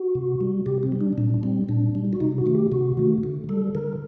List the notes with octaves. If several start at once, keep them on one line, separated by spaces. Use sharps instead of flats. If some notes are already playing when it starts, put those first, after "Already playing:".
Already playing: F#4
C3
G3
C3 G4
C4
G3
D4
A#2 D4
D4
G3 C4
A#2 D4
G3
F#4
C3 D#4
F#4
D#3 A3
G4
C3 F#4
D#3 A3
D3
G3 A4
D3 A#4